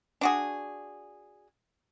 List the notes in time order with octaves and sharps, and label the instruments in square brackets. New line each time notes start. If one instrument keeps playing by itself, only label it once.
[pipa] D4 F#4 G#4